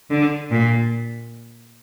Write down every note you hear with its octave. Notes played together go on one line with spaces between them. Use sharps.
D3
A#2